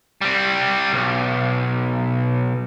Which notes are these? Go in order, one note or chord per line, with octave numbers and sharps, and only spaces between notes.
G3 C4
B1